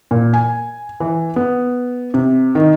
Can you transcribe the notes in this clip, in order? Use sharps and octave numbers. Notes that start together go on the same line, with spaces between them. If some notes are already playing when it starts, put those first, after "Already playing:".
A#2
G#5
E3
B3
C3
D#3